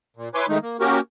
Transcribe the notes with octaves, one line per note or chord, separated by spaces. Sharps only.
A#2
E4 B4 C#5 G#5 C6 D6
D#3 G#3 A3 D#4
A#3
A#3 C#4 F#4 G4 A#4